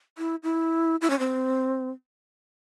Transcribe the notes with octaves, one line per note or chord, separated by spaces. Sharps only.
E4
E4
E4
C#4
C4